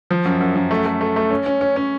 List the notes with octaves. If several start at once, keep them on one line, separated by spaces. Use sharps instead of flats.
F3
F#2
F#2
F#2
A3
A3
A3
A3
C#4
C#4
C#4
C#4